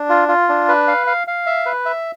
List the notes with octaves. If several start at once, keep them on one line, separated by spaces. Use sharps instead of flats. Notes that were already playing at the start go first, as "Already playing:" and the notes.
Already playing: D4
F4
F4
D4
B4
F5
F5
F5
E5
B4
E5